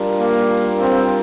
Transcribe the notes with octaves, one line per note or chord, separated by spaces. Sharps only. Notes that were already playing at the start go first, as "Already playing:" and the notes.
Already playing: G3 D4 F4 A#4
A#3
C4